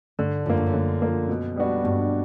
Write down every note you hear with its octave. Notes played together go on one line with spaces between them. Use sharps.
G2 D3
F#2 F3 A#3
G2
F#2
D3
F3 A#3
B2
G3 B3 D4 F#4
G2 B2